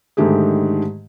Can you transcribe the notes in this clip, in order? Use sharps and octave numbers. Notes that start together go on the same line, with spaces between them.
G#2 D3 D#3 A3 G4 G#4